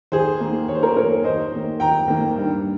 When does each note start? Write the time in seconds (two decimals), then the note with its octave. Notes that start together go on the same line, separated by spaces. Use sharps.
0.12 D#2 G#4 C5
0.40 D#3 A#3
0.68 D#2 C#5
0.75 C5
0.83 A#4 C#5
0.97 D#3 A#3 A#4 C#5
1.24 D#2 C5 D#5
1.52 D#3 A#3
1.80 D#2 G5 A#5
2.08 D#3 A#3
2.37 G2